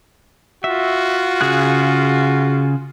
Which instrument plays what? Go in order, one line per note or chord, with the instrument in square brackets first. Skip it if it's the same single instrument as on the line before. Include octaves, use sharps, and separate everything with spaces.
[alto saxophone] F4 [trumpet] F#4 [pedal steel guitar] E5
[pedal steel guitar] C#3 G#4 F#6